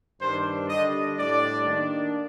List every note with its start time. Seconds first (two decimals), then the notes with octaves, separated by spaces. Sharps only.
0.21 G2 D#3 G3 D4 C5
0.69 D3 G3 D4 D#5
1.17 A2 G3 D4 D5
1.66 D#3 A#3 D4